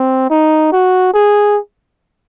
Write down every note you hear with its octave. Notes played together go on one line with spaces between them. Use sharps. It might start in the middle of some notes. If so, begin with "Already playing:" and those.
Already playing: C4
D#4
F#4
G#4